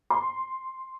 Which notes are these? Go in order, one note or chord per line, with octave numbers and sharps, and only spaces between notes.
C6